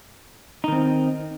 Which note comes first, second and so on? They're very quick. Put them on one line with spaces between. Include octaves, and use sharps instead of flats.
D#4 D#3 C4